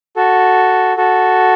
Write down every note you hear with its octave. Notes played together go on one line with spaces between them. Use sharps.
F#4 A4
F#4 A4